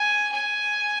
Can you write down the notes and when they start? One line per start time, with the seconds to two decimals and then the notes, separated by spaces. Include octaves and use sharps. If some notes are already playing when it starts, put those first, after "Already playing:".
Already playing: G#5
0.32 G#5